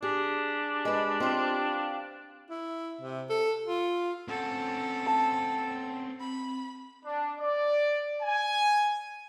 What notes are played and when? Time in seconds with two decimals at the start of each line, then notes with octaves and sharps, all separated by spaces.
0.03 D4 G4 G#4
0.85 G#3 B4
1.20 C4 F4
2.50 E4
3.01 C3
3.29 A4
3.66 F4
4.28 C4 C#4 A4 F#5
5.07 A5
6.20 C4 B5
7.05 D4
7.39 D5
8.22 G#5